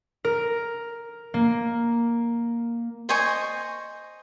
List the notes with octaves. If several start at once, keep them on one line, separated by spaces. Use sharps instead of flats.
A#4
A#3
C5 D#5 G#5 C#6